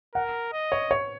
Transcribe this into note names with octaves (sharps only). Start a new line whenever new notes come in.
A#4 F#5
D#5
C#5
C#5